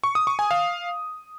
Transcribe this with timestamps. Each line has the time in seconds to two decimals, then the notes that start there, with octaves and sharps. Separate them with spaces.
0.04 C#6
0.15 D#6
0.27 C#6
0.39 G#5
0.51 F5